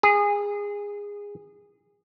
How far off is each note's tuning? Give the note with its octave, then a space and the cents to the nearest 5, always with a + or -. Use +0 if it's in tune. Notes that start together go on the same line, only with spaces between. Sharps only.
G#4 -20